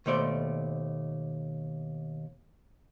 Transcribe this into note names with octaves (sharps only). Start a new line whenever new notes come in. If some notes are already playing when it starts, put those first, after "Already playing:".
D#2 B2 A3 C5 D5